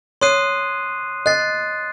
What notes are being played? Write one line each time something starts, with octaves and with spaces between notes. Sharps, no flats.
C#5 C6 D#6 F#6 C7 D#7
D#5 F#6 A6 C7